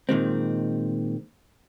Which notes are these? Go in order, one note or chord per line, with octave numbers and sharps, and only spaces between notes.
A#2 D#3 G#3 C4